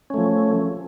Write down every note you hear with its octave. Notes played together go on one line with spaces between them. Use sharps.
F3 A3 C#4